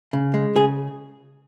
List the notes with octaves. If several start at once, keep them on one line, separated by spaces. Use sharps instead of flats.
C#3
G#3
C#3 G#4